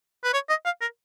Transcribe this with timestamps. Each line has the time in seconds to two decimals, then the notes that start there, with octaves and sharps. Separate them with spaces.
0.24 B4
0.34 C#5
0.49 D#5
0.65 F5
0.81 A#4